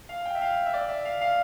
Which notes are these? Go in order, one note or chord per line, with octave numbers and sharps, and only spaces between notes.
F5
G5
E5
F5
E5
D5
E5
F5
F5